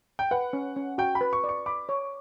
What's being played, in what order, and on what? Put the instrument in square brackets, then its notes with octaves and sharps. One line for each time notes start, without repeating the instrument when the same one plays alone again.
[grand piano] G5
[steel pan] B4 [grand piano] F#5
[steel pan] C#4
C#4
[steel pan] F#4 [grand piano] G5
[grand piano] B5
[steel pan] B4
[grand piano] C#6
[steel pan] D5
[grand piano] C#6
[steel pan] B5 [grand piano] D6
[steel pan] C#5